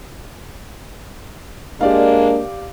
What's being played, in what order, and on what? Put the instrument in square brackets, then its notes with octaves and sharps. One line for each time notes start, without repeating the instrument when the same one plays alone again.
[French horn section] G#3 A#3 D4 [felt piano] G4 D5 F5